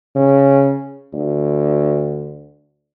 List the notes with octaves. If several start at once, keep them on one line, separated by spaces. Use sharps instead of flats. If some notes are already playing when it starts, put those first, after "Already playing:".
C#3
D2